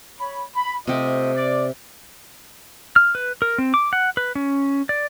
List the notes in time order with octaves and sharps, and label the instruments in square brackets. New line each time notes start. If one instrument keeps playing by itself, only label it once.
[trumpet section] C#5 B5
B5
[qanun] C3 G4 [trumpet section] A3 F4 D#5
[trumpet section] D5
[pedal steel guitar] F6
B4
A#4
C4
D6
F#5
B4
C#4
D5